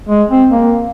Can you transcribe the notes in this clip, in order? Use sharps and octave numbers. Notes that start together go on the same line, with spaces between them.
G#3
C4
A#3